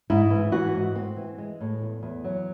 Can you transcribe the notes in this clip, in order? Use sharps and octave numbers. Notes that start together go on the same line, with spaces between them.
G#2 E4
E3
E3 F#4
G#2
C4
E3
G#3
A2
E2
E2
F#3